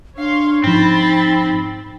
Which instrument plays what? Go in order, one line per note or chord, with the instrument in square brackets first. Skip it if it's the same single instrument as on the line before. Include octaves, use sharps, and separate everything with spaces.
[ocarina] D4 [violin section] C#5 F5 C6
[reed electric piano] G#2 F3 [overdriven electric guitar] C4 [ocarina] D#4 [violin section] B5 A6